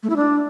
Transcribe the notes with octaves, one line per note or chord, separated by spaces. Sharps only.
A3
E4
D4